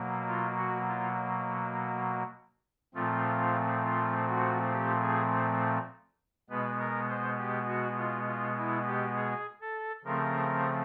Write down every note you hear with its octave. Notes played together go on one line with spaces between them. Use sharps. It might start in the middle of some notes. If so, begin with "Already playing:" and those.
Already playing: B2 F#3 A#3
F4
F#4
F4
A#2 F3 A3 C4 F4
F4
F#4
G4
G#4
B2 G#3 B3 B4
A#4
C5
G4
F#4
F4
F4
E4
G4
G#4
A4
C#3 F3 A3 C4 A#4